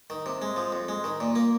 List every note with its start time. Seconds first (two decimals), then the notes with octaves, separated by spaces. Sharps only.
0.10 D#3
0.26 C3
0.42 G#3
0.56 F3
0.72 F2
0.88 G#3
1.04 D#3
1.20 A#2
1.35 A#3